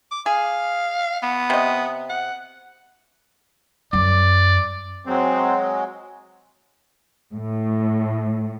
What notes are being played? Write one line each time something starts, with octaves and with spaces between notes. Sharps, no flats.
D6
G#4 F5
B3
C3 D#5
F#5
F#2 D5
F#3 G#3 C4
A2